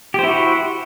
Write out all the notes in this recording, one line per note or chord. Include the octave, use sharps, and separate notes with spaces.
E4 F#4 G4 C5